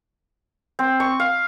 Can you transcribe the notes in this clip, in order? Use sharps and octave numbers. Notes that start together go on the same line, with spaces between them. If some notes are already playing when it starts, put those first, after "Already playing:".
C4
C#6
F5